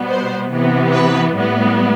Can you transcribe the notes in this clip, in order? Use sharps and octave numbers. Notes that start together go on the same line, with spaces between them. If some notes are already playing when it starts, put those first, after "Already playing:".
Already playing: B2 G3 B3
C5
C3 E3 B3
B4
A2 G3 B3